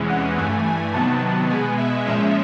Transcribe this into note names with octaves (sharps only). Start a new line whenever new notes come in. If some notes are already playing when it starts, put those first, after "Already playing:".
Already playing: E2 C3 E3 G#3 C#4
F#5
G2 E3 A3 G#5
G#5
C3 D#3 F#3 B3 A5
A5
B2 G#3 B3 G#5
E5
A#2 F3 G#3 C#4 E5